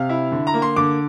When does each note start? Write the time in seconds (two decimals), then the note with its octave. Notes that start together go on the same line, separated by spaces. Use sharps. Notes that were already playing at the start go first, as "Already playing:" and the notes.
Already playing: C3 F5
0.09 E4
0.32 D3
0.47 A#5
0.54 A#3
0.62 C6
0.76 D3 D6